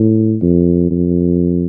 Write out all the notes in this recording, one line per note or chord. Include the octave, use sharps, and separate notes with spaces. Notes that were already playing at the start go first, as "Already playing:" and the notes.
Already playing: A2
F2
F2